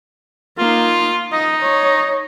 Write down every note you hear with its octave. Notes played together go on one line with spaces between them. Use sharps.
A#3 D#4 F4
D#4 D#5
C#5